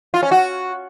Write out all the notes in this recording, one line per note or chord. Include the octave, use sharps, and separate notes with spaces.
F4
C#4
F#4